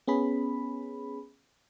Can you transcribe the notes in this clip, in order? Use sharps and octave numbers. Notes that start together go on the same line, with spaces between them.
B3 C#4 G#4 B5